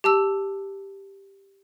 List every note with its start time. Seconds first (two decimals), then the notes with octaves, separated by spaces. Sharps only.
0.04 G4 A5 E6